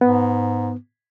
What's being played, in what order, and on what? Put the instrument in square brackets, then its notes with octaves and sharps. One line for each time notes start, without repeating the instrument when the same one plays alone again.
[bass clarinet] G#2 [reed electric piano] B3